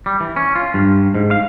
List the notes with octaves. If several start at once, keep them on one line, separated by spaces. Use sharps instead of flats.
G3
E3
C#4
F4
G2
G#2
F5